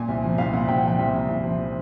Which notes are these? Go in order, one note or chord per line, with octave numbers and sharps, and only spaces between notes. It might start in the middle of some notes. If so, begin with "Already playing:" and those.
Already playing: A#2 G#5
C2
F3
C2 F5
A#2 F#5
C2 G5
F#5
F3 G5
C2
A#2
C2
F3